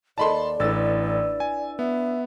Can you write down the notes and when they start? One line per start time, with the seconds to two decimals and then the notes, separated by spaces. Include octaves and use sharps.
0.18 D#2 A4 D5 A5 B5 C6
0.60 A1 D4 E4 B4 E6 A6
1.40 G#5
1.79 B3 E5